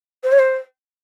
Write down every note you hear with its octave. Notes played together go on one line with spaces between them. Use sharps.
C5
C#5
C5